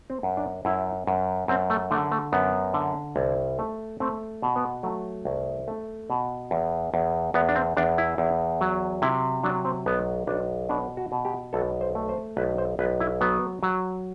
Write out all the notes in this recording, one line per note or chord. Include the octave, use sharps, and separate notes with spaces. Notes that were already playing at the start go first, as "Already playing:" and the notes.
C4
F#2
D4
F#2 E4
F#2
F#2 C4
A3
D3 A3
A3
F#2 B3
D3
C2
A3
A3 C4
B2
B3
F#3 A3
C2
A3
B2
E2
E2
E2 B3
D4
C4
E2 D4
E4
E2
F#3
C3 E4
F#3 D4
C4
B1 B3
B1 D4
B2 D4
F#4
B2
G4
B1 A4
C5
A3
C5
B1 B4
C5
B1 B4
E4
F#3 B3
F#3